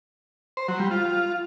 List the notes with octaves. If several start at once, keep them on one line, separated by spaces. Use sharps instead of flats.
C5
F#3
G3
F4